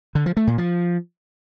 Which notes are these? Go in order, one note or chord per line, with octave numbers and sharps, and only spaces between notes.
D3
F3
A3
A#2
F3